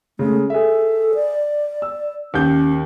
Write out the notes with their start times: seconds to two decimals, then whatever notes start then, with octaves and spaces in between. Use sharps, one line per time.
0.19 C#3 G#3 A3
0.50 G#4 A4 E5
1.14 D5
1.82 E6
2.34 D#2 C#4 G4 G6